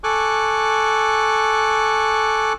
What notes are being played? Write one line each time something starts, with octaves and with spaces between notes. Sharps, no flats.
A4 G#5 C#6 D6 F#6